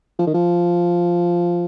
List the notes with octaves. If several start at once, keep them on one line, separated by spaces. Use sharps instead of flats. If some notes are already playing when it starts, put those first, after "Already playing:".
F3
D#3
F3